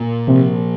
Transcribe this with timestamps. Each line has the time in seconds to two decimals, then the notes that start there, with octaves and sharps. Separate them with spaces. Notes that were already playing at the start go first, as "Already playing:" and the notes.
Already playing: A#2
0.27 C3 F3